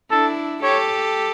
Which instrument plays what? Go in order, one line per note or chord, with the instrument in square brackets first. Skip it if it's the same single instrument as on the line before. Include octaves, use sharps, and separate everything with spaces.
[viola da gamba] D4 E4 [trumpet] A4
[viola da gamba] G4 A4 [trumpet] C#5